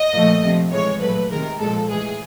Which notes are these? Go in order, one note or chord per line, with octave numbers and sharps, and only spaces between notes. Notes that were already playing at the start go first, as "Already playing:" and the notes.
Already playing: D#5
A#2 F3 A3
C3 F3 A3
A2 E3 G#3 C#5
A#2 F#3 A3 B4
C3 D#3 G#3 A#4
A#2 F3 G#3 A4
A2 E3 G#3 G#4